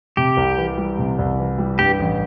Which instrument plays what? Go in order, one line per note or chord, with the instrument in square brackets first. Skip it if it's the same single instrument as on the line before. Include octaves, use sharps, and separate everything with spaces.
[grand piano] C3 [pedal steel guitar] G4
[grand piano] C2
E3
G3
C3
C2
E3
G3
[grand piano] G2 [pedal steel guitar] G4
[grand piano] A1